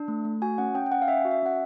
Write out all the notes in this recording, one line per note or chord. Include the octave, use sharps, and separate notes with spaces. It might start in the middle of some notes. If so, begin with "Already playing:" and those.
Already playing: D4
A3
A3
F#4 G#5
C#4 F#5
C#4 G5
G5
C#4 F#5
F5
C#4 E5
F#4
E5
C#4 F#5